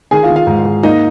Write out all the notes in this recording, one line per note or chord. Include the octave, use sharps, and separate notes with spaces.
D#3 G#4 G#5
F4 F5
D#3
F4 F5
G#2
G#2
A#3 D#4 D#5